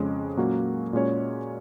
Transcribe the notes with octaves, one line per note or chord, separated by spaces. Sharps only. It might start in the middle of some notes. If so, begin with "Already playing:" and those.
Already playing: F2 C#3 G#3 C#4
A#2 F#3 A#3 C#4 F#4
A#2 G#3 C#4 F#4 C#5